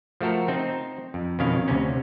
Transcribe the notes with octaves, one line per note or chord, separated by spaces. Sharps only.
F3 A3 F#4 A4 A#4
C4 D#4 C5
F2
F2 B2 D#3 C#4 F5
D2 C3 C#4